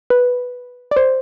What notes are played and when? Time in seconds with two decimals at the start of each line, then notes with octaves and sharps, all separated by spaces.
0.10 B4
0.91 D5
0.96 C5